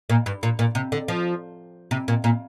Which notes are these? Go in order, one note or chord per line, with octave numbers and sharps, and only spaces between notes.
A#2
G2
A#2
A#2
C3
D3
F3
C3
A#2
A#2